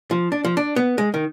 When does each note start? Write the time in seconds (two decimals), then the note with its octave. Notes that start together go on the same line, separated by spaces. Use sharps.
0.11 F3
0.32 D4
0.45 F3
0.57 D4
0.76 B3
0.98 G#3
1.14 D#3